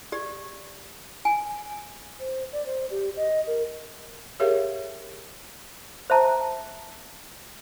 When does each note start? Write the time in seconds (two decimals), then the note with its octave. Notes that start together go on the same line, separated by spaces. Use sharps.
0.12 G4 D5
1.25 G#5
2.20 C5
2.52 D5
2.66 C5
2.91 G4
3.16 D#5
3.47 A#4
4.40 G4 G#4 A#4 C#5 E5 F5
6.10 C5 E5 A5 A#5